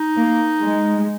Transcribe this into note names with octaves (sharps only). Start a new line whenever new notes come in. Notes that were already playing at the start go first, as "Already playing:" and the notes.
Already playing: D#4
A#3
G#3